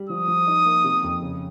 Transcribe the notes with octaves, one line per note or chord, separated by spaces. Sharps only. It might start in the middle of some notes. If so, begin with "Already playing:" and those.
Already playing: G3
F3 D#6
F3
D#4
A#3
C3
F2
C#3